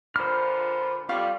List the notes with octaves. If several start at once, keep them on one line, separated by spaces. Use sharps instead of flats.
A#2 D3 F4 C5 B5 F6
F2 G3 F4 C#5 F5